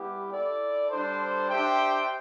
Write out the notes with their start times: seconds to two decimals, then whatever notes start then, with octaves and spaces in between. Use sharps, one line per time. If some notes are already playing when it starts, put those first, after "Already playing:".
Already playing: G3 B3 E4 G4
0.31 E4 A4 D5
0.90 G3 D4 A4 C5
1.49 D4 G4 C5 E5 G5